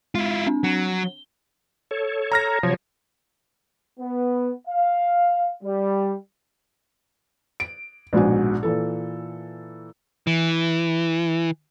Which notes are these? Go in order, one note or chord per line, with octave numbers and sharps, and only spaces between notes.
G#3 E4 F4
C4 D4
F#3
G7
A4 C#5
A#5 F6 A#6
C3 F3 F#3 C#5
B3
F5
G3
D7
A#1 G#2 B2 G#5
A#2 E3 A4
E3